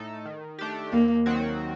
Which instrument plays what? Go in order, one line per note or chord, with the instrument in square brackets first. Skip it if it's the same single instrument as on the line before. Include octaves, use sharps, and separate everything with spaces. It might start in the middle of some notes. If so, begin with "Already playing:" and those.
Already playing: [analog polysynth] A2 A3 D#4 A4
D#3
A3 D4 G4
[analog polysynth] D#2 [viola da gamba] A#3
[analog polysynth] D#3 F#3 C4 F#4